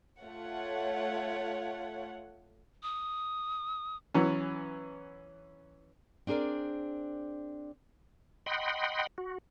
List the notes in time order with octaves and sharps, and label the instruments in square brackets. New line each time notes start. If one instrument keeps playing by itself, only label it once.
[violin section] A3 F4 C#5 F#5
[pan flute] D#6
[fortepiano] E3 F#3 B3 C#4
[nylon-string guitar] C4 D4 G#4 A#4 D5
[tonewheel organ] D#5 F#5 G5 B5 C6
F#4